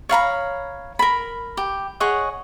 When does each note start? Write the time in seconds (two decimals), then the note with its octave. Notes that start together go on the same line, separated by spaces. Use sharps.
0.09 C#5 F5 A#5 B5
0.99 A#4 B5
1.57 G4
2.00 G#4 C#5 D#5 F#5